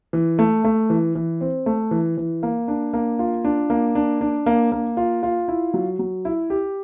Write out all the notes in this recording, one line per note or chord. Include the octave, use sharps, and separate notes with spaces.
E3
A3
A3
E3
E3
C4
A3
E3
E3
A#3
D4
A#3
F4
D4
A#3
D4
D4
A#3
A#3
F4
F4
E4
F#3
F#3
E4
G4